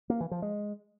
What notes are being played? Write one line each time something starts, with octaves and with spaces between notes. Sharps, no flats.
A#3
E3
F3
G#3